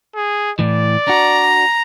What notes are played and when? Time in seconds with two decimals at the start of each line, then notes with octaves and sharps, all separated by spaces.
0.16 G#4
0.59 A2 E3 D5
1.08 D4 F#4 A#5